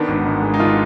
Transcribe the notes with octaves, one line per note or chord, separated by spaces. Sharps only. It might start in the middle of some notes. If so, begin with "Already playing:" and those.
Already playing: D#3 B3 D4
G#1
G#2
G#3
D#4
D#3 D4 F4